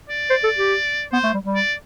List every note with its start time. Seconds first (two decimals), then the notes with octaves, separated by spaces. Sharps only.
0.09 D5
0.30 C5
0.44 A4
0.58 G4
1.12 B3 C5
1.24 A3
1.34 G3
1.44 G3
1.55 D5